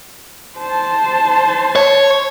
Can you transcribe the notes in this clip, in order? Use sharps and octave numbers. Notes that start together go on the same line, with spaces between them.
C5 A5
C#5